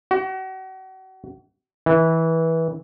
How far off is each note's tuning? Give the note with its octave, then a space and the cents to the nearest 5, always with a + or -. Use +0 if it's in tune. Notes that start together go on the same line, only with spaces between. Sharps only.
F#4 +35
E3 -20